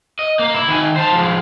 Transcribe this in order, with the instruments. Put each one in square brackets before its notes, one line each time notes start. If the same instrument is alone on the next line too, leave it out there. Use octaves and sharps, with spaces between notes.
[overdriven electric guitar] D#5
A#3
E4
D#3 G#5
C5 A5
F3 G#3